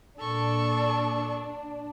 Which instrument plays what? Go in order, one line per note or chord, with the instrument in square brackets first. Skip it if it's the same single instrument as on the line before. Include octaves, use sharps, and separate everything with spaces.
[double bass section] A#2 [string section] D4 [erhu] A4 [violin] C#6